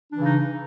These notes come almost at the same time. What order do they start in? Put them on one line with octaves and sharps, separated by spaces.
D4 E3 C#3 D#4